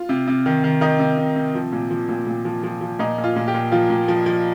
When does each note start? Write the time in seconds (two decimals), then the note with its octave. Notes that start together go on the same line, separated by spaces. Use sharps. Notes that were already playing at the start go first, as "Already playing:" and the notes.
Already playing: F4
0.09 C3
0.28 C3
0.46 D#3
0.64 D#3
0.81 D#3 D#4
0.99 C3
1.18 C3
1.36 C3
1.55 F3
1.73 A#2
1.91 F3
2.09 A#2
2.27 A#2
2.45 F3
2.64 F3
2.81 F3
2.99 A#2 D#4
3.18 A#2
3.24 F4
3.36 A#2
3.48 G4
3.54 A#2
3.72 F3 F4
3.90 A#2
4.08 F3
4.26 F3